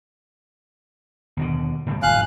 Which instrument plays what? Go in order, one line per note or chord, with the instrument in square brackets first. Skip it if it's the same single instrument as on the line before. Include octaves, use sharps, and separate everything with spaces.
[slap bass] D#2 B2 D3
A2 C#3 G3
[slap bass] D#1 G#1 F3 [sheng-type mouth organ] F5 F#6 [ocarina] G#5